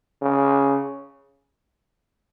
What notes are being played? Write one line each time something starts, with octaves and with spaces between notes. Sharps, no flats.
C#3